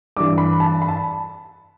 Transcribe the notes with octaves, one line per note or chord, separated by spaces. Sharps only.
G2 E3 D6
B5
A5
B5
A5